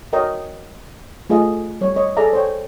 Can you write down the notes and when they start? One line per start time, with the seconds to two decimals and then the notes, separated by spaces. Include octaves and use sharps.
0.13 F#4 A#4 C#5 D#5 G5
1.30 A3 F4 G#4 D#5
1.81 G3 C#5
1.96 C#5 D#5
2.17 G#4 A4 D5 E5 A#5
2.33 C5 C#5 G5